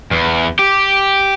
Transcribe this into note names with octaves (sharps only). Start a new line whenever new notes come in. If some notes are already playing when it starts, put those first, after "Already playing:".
E2
G4